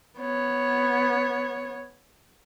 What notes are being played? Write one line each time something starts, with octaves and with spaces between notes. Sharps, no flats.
B3 C#5